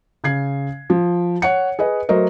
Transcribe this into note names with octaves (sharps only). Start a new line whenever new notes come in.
C#3 G#6 C7
F3
C#5 F#5 C#7
G#4 B4 D#5
F#3 A3 A#4 C5 D#5